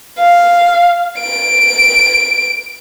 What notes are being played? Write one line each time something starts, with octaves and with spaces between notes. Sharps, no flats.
F5
D7